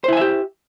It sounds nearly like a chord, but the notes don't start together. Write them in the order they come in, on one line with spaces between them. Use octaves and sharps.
C5 E4 G#5 E5 G4